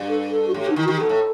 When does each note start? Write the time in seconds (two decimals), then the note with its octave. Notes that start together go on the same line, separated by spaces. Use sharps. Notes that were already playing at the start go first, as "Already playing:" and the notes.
Already playing: G2
0.08 A4
0.31 A4
0.47 F#4
0.54 A2 G4
0.66 B2 D#4
0.76 D#3 E4
0.84 F#4
0.88 D#3 G4
1.00 B2 A4
1.09 A2